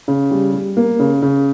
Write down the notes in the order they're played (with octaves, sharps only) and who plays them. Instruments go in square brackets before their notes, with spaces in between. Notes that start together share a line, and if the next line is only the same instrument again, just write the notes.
[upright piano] C#3
G3
G3
A#3
C#3
C#3